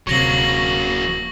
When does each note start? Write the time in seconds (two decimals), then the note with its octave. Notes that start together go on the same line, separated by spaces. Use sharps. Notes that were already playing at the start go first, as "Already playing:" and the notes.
0.07 D1 C3 F#3 A#3 C#6 A#6 F#7